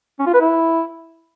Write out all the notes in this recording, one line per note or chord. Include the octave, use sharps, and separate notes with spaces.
C#4
F4
B4
E4